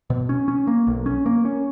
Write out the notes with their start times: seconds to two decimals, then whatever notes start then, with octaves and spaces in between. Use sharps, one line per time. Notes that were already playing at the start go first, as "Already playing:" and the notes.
0.10 B2
0.29 C#4
0.48 C#4
0.67 A#3
0.87 B1
1.06 C#4
1.26 A#3
1.45 C#4